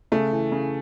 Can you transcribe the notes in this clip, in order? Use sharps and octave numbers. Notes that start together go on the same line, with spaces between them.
C#3 A3
E3
C#3